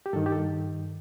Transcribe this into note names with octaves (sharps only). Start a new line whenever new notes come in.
G4
G2 D#3 A4
G4
A4